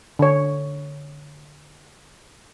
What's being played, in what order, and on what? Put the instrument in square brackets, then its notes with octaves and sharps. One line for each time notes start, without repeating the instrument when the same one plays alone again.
[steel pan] D3 C#5